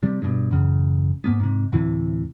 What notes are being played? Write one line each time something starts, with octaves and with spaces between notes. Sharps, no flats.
C3 G3
G2 B2
A1 F#2 C#3
G#2 A#3 B3
G#2 C3
D2 A2 C3 E3